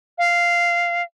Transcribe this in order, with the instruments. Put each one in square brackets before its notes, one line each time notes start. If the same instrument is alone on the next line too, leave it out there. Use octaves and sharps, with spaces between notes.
[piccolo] F5